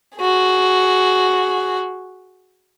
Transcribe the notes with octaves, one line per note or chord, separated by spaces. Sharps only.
F#4 G#4